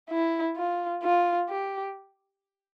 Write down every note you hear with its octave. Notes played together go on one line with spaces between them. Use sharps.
E4
F4
F4
G4